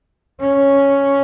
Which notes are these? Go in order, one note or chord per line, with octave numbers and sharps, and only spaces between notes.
C#4